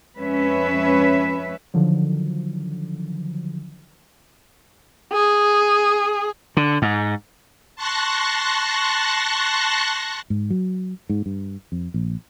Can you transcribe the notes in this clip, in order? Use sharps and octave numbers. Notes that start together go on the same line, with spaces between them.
F2 G#3 C#4 B4 E5
D3 D#3 F3 F#3
G#4
D3
G#2
A5 C6 C#6 F#6 A#6
G#2
F#3
G#2
G2
F2
A#1